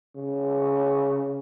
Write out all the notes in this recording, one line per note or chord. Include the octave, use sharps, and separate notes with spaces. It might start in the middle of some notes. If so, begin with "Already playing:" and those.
C#3